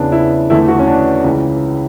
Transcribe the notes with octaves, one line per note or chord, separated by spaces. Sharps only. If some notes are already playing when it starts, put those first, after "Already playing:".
Already playing: E2 C#3 E3 B3 D4
E4
E2 D3 A3 E4
F#4
C#4
D4
C#2 C#3 E3